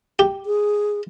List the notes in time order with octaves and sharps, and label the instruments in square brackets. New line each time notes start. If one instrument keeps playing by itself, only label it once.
[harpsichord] G4
[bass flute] G#4